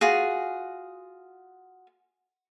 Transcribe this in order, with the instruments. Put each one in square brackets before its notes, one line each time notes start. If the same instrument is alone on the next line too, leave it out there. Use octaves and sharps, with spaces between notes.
[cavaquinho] F4 F#4 G#4